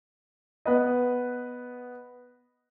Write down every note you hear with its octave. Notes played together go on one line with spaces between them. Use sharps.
B3 B4 D#5